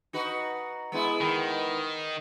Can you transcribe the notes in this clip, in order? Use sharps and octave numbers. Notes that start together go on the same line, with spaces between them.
D#4 F#4 B4
G#3 B3 E4
D#3